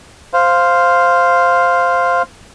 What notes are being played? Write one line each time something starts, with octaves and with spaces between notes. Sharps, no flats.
C5 F5